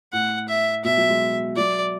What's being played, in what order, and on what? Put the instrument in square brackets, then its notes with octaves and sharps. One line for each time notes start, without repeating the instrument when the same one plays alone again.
[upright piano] A2 [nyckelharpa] F#5
[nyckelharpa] E5
[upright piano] B2 [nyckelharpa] E5
[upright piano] F#3
G#3
[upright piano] F#3 [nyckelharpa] D5